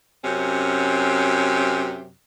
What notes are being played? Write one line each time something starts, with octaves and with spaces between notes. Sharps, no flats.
F#2 C3 C#4